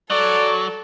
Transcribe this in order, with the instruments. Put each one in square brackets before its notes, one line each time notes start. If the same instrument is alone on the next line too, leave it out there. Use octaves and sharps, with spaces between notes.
[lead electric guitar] F#3 [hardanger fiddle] A4 [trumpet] D5